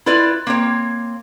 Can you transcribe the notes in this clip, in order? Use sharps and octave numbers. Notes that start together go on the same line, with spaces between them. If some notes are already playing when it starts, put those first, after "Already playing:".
E4 F4 B4 D5
A#3 C4 C#5